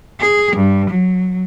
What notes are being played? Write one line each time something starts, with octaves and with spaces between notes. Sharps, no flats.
G#4
G2
F#3